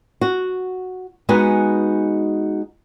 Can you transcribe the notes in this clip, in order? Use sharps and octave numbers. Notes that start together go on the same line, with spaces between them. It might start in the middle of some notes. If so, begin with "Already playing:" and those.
F#4
G#3 B3 D#4 F#4 B4 G#5